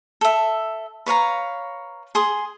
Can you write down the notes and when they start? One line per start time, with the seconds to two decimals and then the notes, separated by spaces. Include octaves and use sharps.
0.21 A4 E5
1.06 B4 C#5 F5 A#5
2.15 G#4 C6 D#6